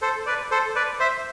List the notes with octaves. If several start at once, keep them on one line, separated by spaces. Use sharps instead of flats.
A4 C5
B4 D5
A4 C5
B4 D5
C5 E5